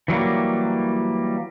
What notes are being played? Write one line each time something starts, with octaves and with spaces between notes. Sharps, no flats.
E3 F#3 G3 A#3